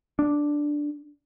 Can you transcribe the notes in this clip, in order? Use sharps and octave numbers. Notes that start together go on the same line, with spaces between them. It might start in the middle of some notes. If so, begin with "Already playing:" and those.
D4